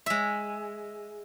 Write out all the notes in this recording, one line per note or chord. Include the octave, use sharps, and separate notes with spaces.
G#3 E5